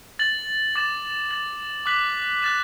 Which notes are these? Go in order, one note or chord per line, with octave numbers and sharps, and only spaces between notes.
A6 F#7
D6 A6 E7
A6 F#7
D6 F#6 B6 F#7
F#6 A6 E7